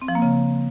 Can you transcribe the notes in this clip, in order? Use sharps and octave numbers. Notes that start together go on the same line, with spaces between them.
C4
F3
A#3
C#3